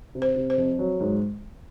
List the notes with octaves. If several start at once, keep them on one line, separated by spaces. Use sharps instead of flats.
C3
C5
C3
C5
F2
F#3
G#2